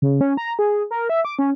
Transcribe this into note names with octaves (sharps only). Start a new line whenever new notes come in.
C#3
C#4
A#5
G#4
A#4
E5
D6
C#4